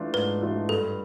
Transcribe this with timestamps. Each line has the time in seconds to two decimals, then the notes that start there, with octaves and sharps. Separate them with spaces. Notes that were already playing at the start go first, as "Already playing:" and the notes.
Already playing: E3 A3 D4 F4
0.14 G#2 B4
0.42 E3 A3 D4 F4
0.69 G2 A4